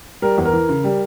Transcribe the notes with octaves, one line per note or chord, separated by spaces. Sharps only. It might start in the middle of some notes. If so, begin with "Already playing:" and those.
G3 A#4
E2
A#4
E3
C#3
G3